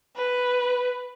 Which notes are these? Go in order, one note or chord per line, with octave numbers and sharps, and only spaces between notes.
B4